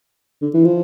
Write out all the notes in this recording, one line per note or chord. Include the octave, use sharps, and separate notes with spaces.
D3
E3
F3